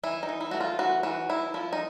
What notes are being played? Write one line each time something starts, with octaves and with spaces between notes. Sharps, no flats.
E3 E4
D#4
E3
E4
A3 F#4
F4
E3 F#4
E3 F#4
E3 E4
F3 E4
D#4